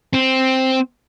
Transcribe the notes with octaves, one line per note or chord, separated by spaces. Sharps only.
C4